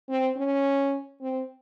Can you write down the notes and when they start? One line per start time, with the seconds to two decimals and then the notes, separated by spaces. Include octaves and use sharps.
0.09 C4
0.37 C#4
1.21 C4